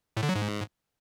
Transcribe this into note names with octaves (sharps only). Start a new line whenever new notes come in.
A2
D3
F#3
G#2